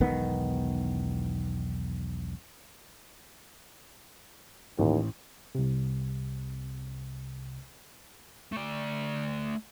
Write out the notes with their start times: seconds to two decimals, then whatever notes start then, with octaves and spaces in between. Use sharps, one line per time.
0.01 E1 B1 D#3 B3
4.79 A1 D#2
5.55 C2 C3
8.52 A3 D5